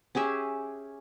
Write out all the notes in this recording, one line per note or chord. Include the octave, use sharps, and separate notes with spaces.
C#4 G4 G#4 E5